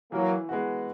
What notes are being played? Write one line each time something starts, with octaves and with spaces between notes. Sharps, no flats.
E3 F#3 A#3
G#3 B3 F#4